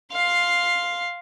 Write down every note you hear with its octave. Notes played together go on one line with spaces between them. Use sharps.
F5 C6